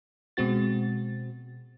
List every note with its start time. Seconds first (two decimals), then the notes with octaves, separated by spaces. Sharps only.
0.37 B2 G#3 C4 F#4 A6